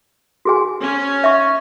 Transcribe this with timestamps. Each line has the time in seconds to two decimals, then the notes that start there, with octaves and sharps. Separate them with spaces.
0.45 F#4 G#4 G#5
0.80 C#4
1.24 E5 C#6